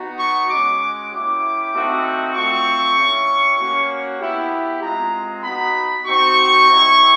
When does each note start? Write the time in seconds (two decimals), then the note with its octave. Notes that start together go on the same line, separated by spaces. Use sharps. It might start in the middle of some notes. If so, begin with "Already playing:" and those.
Already playing: B3 D#4 F#4
0.19 C#6
0.49 G#3 C#4 F#4 D6
1.11 A#3 C#4 E4 G4 D6
1.73 A3 C4 D#4 F#4
2.34 A3 C4 F4 C#6
2.97 A3 C#4 E4 G4
3.58 A#3 C#4 F#4
4.19 B3 E4 G4
4.81 G#3 C4 F4 A#5
5.43 B3 D#4 F#4 B5
6.05 C4 D#4 F#4 C#6
6.67 C4 E4 G4